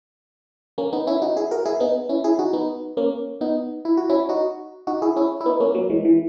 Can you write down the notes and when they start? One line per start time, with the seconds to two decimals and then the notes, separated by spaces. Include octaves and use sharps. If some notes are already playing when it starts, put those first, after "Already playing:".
0.78 A#3 C#4
0.93 B3 D#4
1.07 C#4 E4
1.22 D#4 F#4
1.36 E4 G#4
1.51 F#4 A#4
1.65 E4 G#4
1.80 B3 D#4
2.09 C#4 E4
2.24 E4 G#4
2.39 D#4 F#4
2.53 B3 D#4
2.97 A#3 C#4
3.41 B3 D#4
3.85 E4
3.97 F#4
4.09 C#4 E4
4.29 D#4 F#4
4.87 D#4 F#4
5.02 E4 G#4
5.16 C#4 E4
5.41 E4
5.46 B3 D#4
5.60 A#3 C#4
5.75 F#3 A#3
5.90 E3 G#3
6.05 E3